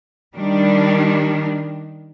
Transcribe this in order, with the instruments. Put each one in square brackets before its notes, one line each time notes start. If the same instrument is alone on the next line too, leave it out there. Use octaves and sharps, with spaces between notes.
[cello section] D#3 G3 D4